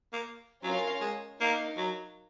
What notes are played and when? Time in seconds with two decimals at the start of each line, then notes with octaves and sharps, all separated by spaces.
0.13 A#3
0.64 F#3 C#4 F4 A#4 F5
1.01 G#3
1.40 A#3 D#4 A#4 F5
1.77 F#3